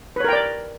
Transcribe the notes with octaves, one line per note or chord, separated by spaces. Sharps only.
A#4 B4 C#5 D5 G5